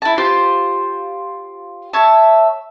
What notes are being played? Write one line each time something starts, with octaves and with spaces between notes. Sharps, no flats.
E4 A5
F4 G4 C5
C#5 E5 A5